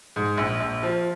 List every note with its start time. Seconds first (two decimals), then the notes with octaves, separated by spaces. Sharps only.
0.16 G#2
0.37 A#1
0.60 A#1
0.83 F3